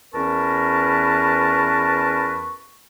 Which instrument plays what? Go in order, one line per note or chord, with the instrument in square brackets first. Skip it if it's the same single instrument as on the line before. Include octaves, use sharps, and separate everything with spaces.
[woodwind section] E2 C#4 A#4 B4 A5 C#6